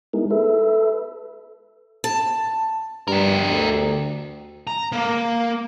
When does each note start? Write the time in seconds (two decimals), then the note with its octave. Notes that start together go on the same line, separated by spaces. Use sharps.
0.13 G#3 B3 D#4 E4 G#4 A#4
0.31 A4 B4 E5
2.04 A5
3.08 G2 G4 A#4
3.51 D2
4.67 A#5
4.92 A#3